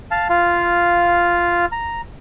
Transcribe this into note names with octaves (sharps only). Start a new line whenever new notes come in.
F5 A5
F4 F5
A#5